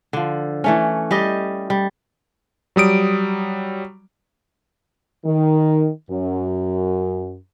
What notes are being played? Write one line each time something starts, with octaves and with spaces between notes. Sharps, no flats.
D3 F3
E3 A3 C#4
G3 G4 D#5
G3
F#3 G3 D#6 D7
D#3
F#2